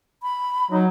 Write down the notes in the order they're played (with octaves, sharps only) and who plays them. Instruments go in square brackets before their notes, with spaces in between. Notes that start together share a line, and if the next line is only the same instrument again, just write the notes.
[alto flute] B5
[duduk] F#3 [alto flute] D#4